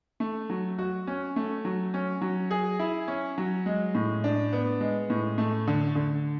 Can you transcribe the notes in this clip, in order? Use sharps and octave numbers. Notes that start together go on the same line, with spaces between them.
A3
F#3
F#4
C#4
A3
F#3
C#4
F#3
G#4
E4
C#4
F#3
G#3
A2
D4
B3
G#3
A2
A3
D3
D3